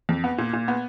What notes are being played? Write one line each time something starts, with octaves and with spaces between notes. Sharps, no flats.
F2
B3
A#2
A#2
B3